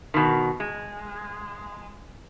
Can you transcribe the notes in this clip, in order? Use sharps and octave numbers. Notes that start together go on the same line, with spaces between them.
B2 D#3
G#3